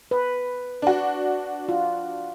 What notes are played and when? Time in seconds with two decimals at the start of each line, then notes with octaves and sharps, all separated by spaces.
0.11 B4
0.82 D4 F#4
1.69 F4